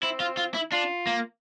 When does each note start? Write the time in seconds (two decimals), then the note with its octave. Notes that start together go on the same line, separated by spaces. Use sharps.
0.02 C4 E4
0.20 F4
0.37 F4
0.54 E4
0.72 D4 F4
1.07 A#3